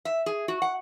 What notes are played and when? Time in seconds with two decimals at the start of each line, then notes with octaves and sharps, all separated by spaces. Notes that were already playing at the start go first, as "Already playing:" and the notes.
0.05 E5
0.26 G#4
0.48 F#4
0.62 F#5